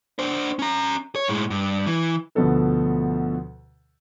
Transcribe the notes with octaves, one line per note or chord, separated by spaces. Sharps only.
D4 C5
C#4 A#5
C#5
A2 G#3
G2
E3
D2 B2 F3 A4 B4